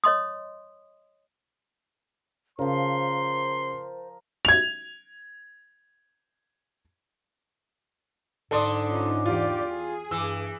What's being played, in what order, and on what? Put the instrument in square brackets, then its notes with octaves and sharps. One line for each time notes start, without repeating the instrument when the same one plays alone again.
[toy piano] C#5 D#5 C6 D#6
[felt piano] C#3 [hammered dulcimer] F3 A#4 [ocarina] C5 [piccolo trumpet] C6
[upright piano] G#6 F7
[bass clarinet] G#2 [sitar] D3 D4 [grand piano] A4 C6 D#6
[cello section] C#4 D#4 F4
[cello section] E2 G4 D5 [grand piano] F4
[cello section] G#4
[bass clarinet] G2 [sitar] E3 [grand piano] E6